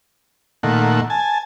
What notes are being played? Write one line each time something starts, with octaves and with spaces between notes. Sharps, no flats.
A#2 D#3 A3 F#5
G#5 A5